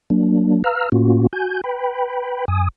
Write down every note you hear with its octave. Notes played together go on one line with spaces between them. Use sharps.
F#3 A#3 D4
B4 F5 A#5 E6 F6
A2 A#3 C#4 F4 F#4
F#4 G#5 G6
B4 G5 B5
F#2 G#5 D#6